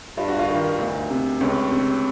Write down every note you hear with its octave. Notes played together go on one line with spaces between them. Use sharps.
G2 F4
F#4
F4
D#3
D2
C3
C#2 C#4
C3